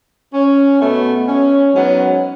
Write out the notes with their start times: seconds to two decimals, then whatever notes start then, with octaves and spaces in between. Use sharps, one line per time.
0.34 C#4
0.80 B2 A3 B3
1.28 C#4
1.74 G#2 F#3 B3 C#4